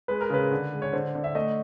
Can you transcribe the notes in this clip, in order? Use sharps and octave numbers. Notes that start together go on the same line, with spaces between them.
G#3 B4
A#4
C#3 B4
D3
G#3
C#5
D3 C5
D3
E5
A3 D#5